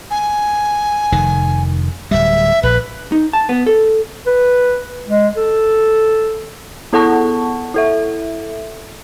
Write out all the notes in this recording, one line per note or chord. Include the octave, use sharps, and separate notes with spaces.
G#5
F1 D#3
D1 G3 E5
A#1 B4
D#4
A5
B3
A4
B4
G#3
A4
B3 E4 A4 F#5 A5 C#6
E4 A4 E5